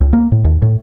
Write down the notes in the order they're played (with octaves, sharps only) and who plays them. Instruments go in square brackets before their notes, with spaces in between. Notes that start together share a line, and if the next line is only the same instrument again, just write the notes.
[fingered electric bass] C#2
A#3
A2
D#2
A2